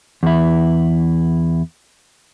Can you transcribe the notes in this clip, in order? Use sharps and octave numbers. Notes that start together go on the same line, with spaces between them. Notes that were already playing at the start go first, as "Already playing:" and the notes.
E2 E4